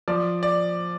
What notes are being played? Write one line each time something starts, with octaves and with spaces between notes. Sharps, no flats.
F3 D5
D5